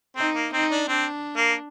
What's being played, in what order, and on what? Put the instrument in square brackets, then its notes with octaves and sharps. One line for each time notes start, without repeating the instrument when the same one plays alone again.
[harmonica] C4 [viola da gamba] D#4
[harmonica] A#3
[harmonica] C4 [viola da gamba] D#4
[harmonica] D4
[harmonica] C4 [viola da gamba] D4
[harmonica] A#3